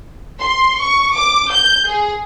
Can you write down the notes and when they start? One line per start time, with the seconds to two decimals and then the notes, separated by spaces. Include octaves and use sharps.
0.41 C6
0.81 C#6
1.14 D6
1.52 G6
1.88 G#4